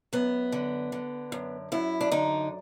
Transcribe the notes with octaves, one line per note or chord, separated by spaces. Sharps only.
F#2 B3
D3
D3
F#2
F#2 E4
D4
D3 D#4